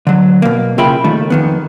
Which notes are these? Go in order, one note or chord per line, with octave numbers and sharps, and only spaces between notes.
D3 F#3
B2 A#3
C#3 F4 E5 G5 B5
D#2 D#3 A3
F2 D#3 B3